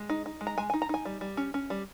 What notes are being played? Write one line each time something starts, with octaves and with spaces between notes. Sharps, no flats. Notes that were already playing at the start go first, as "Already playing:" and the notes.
Already playing: G#3
D#4
D#4
G#3
A#5
G#3 G#5
G#5
D#4
A#5
D#4 G#5
G3
G3
C#4
C#4
G3